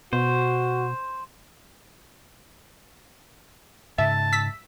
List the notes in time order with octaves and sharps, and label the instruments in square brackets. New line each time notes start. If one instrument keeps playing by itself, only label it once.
[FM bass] B2 [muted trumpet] F#4 [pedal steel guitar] C5
[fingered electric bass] G#2 C#3 [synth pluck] E5 [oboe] A5
[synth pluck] E6 B6